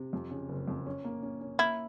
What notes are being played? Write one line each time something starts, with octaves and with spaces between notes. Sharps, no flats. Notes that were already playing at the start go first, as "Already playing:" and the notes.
Already playing: C3
F2
C#3
F#1
F2
C#4
A#3
C#4
C#4
A#3 E4